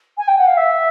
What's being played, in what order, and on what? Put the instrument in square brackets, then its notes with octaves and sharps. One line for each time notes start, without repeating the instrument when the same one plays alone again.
[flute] G#5
G5
F#5
F5
E5